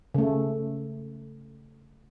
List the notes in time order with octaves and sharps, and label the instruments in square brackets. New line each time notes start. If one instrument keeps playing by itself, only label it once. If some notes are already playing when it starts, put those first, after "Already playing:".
[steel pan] C#3 A3